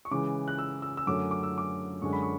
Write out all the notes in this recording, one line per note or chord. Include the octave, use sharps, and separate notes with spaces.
C#6
C#3 E3 G#3 D6
F#6
E6
E6
E6
F#2 D3 F#3 A3 C#4 D6
D6
E6
D6
F#2 D3 G#3 C#4 C#6
B5
C#6